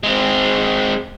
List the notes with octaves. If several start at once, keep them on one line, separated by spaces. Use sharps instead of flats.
G#3 C4